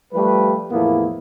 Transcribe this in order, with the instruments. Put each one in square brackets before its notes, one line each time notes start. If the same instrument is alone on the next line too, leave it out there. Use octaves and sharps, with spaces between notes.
[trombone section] F3 G3 A3 G4 B4
E2 A2 F3 A#3 B3 E4